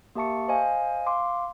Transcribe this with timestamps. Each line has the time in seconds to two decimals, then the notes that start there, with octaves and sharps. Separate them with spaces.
0.15 A#3 G4 E5 A5 C#6 C#7
0.48 C5 D#5 F5 G#5
1.06 F5 C6 D6